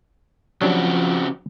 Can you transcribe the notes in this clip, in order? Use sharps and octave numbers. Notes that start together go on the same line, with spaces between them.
C#3 F3 F#3 C4 D4 F#4 G4